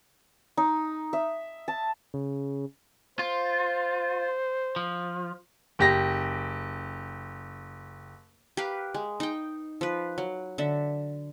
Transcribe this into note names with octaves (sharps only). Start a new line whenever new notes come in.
D#4
E5
A5
C#3
F4 C5
F3
F#1 G4 A#6
G4 A#4 B4 F5
G#3
D#4 G5
F3 B4
F#3
D3 E5